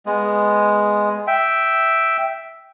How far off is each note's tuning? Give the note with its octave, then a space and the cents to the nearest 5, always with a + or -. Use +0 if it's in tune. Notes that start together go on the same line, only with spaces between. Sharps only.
G#3 +0 B3 +0
E5 +0 G5 -5